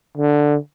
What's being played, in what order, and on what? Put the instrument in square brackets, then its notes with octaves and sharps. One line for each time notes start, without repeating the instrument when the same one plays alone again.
[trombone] D3